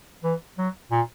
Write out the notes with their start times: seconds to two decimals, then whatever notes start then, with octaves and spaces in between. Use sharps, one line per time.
0.24 E3
0.58 F#3
0.91 A#2